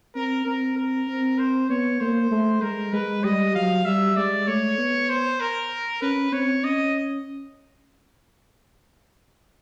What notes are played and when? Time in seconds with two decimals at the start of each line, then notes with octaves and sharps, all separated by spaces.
0.15 C4 A#4
0.46 C4 A#4
0.77 A#4
1.08 C4
1.39 C5
1.70 B3 C#5
2.01 A#3 C5
2.31 A3
2.62 G#3 A#4
2.93 G#3 B4
3.24 G3 D#5
3.55 F#3 F5
3.85 G3 E5
4.17 G#3 D5
4.47 A3 C#5
4.78 B3
5.09 C5
5.40 A#4
6.02 C#4 B4
6.32 C4 C#5
6.64 C#4 D#5